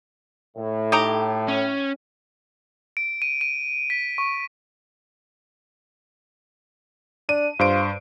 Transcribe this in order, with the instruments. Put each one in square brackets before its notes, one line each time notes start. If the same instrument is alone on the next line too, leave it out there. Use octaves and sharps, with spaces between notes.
[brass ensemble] A2
[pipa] D#4 G4 A#5
[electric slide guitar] C#4
[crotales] D7
D#7
D#7
B6
C#6
[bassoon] D4 [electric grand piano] D#7
[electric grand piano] G2 C5 D7 [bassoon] F4